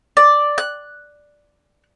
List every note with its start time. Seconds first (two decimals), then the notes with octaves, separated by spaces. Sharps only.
0.17 D5
0.58 F#6